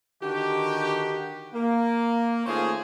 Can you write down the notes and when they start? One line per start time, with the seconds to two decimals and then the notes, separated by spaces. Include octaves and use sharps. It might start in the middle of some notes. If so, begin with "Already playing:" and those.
0.23 D3 D#3 F#4 G4
1.54 A#3
2.46 D#3 A3 C#4 F4 G#4 C5